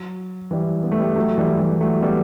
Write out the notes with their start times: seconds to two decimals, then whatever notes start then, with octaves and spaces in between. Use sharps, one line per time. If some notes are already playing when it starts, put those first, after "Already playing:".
Already playing: F#3
0.51 E3 G3
0.83 B3
0.91 A3
1.00 G3 B3
1.16 F#3 A3
1.38 E3 G3
1.59 E3 G3
1.80 F#3 A3
2.02 G3 B3